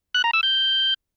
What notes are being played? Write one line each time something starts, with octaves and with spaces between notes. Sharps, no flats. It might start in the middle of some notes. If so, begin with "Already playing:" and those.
F#6
A#5
E6
G6